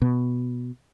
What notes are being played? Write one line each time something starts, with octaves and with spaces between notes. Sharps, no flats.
B2